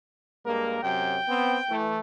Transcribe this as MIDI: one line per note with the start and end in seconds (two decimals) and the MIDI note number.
0.46 0.82 43
0.46 0.82 56
0.46 0.82 58
0.46 0.79 70
0.83 1.21 42
0.83 1.21 48
0.83 1.21 54
0.83 1.75 79
1.29 1.58 59
1.29 1.58 60
1.70 2.00 52
1.70 2.00 57